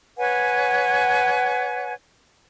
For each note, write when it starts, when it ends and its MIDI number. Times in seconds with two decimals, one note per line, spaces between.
0.18 1.93 71
0.18 1.93 73
0.18 1.93 78
0.18 1.93 80